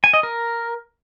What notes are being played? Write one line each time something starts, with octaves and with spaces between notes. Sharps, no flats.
G#5
D#5
A#4